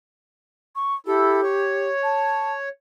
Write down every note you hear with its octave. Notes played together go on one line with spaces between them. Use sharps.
C#6
E4 G4 A4
C#5
A5